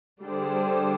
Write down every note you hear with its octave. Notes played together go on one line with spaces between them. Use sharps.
D3 G3 D4 G#4 C5